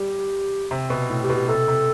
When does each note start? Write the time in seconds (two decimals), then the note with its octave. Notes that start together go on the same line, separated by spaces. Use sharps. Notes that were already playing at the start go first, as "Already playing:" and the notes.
Already playing: G3 G4
0.71 C3
0.90 B2
1.10 A2
1.23 G4
1.30 B2
1.35 G4
1.48 C3 A4
1.68 C3